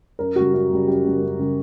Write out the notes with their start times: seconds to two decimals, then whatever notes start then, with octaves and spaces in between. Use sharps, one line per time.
0.19 F#2 A#4
0.36 C#3 G3 F#4
0.53 F#2 F#4
0.71 C#3 G3
0.87 F#2 G4
1.04 C#3 G3
1.21 F#2
1.39 C#3 G3